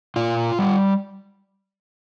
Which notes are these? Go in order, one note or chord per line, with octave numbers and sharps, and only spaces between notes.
A#2 F4
G3